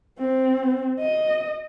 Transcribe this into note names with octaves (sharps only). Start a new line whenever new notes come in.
C4
D#5